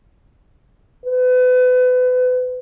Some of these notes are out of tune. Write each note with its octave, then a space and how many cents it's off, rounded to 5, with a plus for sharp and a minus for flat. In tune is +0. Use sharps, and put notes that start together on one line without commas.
B4 +30